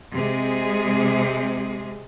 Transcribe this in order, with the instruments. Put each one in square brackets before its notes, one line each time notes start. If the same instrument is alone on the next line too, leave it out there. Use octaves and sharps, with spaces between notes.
[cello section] C3 G#3 G#4